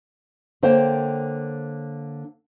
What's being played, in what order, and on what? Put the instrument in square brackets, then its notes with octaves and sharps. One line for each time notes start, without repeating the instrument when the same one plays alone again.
[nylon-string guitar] D3 A#3 C5 C#5 G5